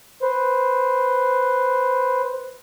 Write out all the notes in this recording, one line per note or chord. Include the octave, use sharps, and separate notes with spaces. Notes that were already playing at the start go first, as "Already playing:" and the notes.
B4 C5